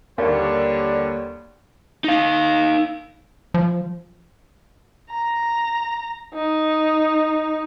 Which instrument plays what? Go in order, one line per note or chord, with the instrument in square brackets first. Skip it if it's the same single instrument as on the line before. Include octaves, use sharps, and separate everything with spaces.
[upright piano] D#2 [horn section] D3 C#5 [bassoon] G3 [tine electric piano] A#3
[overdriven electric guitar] D#4 F5
[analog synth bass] F3
[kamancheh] A#5
D#4